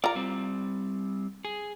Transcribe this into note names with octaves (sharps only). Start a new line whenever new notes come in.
F4 A#4 D5 A#5
G3 C4
G#4